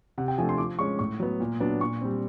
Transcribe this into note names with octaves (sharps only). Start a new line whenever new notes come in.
C3 F#5
G5
F3 A3 D4 G#5
C6
F3 D6
G#3 C#4 C#6
A2 C#6
F#3 B3
A#2
F#3 B3 D4
A#2 C#6
G3 C4